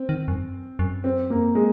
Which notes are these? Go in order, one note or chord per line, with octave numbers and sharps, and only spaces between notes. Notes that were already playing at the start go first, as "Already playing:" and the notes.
Already playing: C4
D#3
F#2
F#2
C4
A#3
G#3